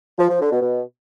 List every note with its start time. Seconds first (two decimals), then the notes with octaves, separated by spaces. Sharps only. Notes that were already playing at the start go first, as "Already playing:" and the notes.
0.19 F3
0.30 F3
0.41 D3
0.52 B2
0.62 B2